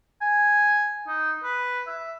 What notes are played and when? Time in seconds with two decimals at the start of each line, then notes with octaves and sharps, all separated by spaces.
0.21 G#5
1.07 D#4
1.44 B4
1.87 E5